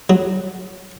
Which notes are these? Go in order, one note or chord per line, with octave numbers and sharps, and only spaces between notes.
F#3